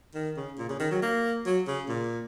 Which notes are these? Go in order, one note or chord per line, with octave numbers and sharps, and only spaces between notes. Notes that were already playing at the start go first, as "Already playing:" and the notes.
D#3
C#3
A#2
C#3
D#3
F#3
A#3
F#3
C#3
A#2